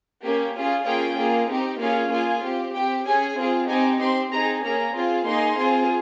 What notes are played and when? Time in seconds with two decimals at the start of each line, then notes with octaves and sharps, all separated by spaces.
0.23 A#3 C#4 G4
0.55 C#4 F4 G#4
0.86 A#3 C#4 F4 G#4 G5
1.18 A#3 F4 G#4
1.50 C4 D#4 G4
1.80 A#3 C#4 F4 G#4 F5
2.11 A#3 F4 G#4 G#5
2.44 C4 G4
2.75 C4 G4 G5
3.06 C#4 G#4 G#5
3.38 C4 F4 G#4
3.69 C4 D#4 G4 G#5
4.00 C4 G4 C6
4.32 C4 D#4 G#4 A#5
4.63 A#3 C#4 G#4 A#5
4.95 C4 F4 G#4
5.26 A#3 D#4 G#4 C6
5.58 C4 F4 G#4